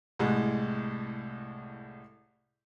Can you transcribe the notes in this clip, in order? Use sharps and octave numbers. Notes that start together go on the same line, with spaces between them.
C2 A2 G#3